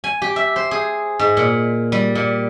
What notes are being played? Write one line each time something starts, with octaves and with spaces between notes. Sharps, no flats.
G#5
G4
E5
C5
G#4
G#2
A#2
G3
A#2